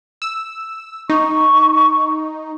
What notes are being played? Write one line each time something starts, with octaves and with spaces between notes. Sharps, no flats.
E6
D#4 C#6